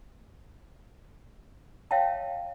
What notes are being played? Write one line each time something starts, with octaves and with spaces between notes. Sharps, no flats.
C#5 E5 F5 G5 A5